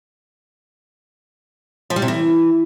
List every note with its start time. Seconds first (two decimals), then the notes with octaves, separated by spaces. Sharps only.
1.90 F3
1.96 G3
2.02 C3
2.08 E3